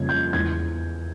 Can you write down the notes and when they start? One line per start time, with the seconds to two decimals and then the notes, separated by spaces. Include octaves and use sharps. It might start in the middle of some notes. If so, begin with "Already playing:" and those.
Already playing: F2 C#3 G3 A#3 G#6
0.09 G6
0.33 E2 E3 G#3 G#6